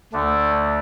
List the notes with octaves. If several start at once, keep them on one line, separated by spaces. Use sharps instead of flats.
D2 D3 A3 D4